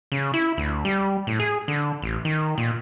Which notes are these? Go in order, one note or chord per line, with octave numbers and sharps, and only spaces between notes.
C#3
E4
D2
G3
A2
G#4
D3
A1
D#3
A#2